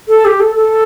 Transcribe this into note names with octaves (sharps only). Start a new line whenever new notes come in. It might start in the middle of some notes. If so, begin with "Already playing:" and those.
A4
G4
A4
A4